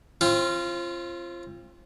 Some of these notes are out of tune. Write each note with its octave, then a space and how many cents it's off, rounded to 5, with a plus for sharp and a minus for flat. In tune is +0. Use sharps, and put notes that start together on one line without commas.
C4 +30 F4 -20